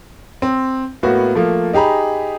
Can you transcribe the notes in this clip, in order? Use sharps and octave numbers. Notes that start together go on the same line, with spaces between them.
C4
A2 A#3 B3 F#4
F3 A3 A#3
D#4 G4 G#4 A#5 B5